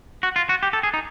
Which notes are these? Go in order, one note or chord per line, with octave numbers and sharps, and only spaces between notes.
F#4
F4
F#4
G4
A4
G#4
D#4